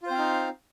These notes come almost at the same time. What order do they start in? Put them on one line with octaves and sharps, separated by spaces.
F4 C5 C4 F5 D#4